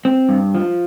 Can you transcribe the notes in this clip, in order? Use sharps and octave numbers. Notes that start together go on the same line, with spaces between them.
C4
G2
F3